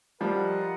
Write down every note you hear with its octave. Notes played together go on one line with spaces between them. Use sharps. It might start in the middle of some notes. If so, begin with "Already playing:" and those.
F3 G3 F4 A#4 D#5 F#5